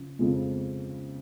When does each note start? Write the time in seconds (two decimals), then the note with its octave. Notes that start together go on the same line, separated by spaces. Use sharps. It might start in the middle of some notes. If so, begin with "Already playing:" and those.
Already playing: C#3 F3
0.19 F2 C#3 F3 G#3